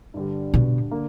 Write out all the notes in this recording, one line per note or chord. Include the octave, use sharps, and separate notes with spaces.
G2 D3 G3
B2
D3 A#3